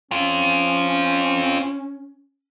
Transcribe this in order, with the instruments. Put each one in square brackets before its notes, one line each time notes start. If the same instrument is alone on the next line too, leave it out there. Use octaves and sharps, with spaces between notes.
[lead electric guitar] C4 F4 [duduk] C#4